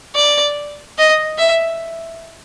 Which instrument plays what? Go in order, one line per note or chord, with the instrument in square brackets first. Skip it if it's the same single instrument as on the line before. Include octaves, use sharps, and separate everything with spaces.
[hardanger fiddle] D5
D#5
E5